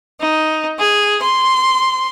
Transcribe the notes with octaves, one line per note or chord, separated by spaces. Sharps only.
D#4
G#4
C6